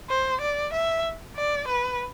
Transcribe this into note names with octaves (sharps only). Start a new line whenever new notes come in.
C5
D5
E5
D5
B4